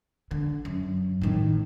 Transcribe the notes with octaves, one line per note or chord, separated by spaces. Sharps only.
D3
F#2
A2 D#3